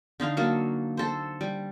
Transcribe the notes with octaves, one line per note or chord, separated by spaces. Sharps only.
D3 D#4 F5 A#5
F#3 A#3 A4
A4 C5
G3